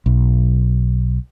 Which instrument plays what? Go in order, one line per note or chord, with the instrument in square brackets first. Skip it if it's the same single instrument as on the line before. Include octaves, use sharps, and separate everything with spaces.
[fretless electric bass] B1